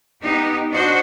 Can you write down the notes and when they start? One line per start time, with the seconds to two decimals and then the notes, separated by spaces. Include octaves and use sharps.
0.22 B3 D#4 G4
0.71 D4 F#4 C5 D#5